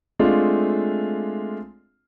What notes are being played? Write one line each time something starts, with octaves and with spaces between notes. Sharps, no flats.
G#3 A3 C4 D4 F4